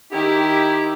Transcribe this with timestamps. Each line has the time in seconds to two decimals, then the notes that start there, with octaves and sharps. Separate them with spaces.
0.12 D#3 E4 G4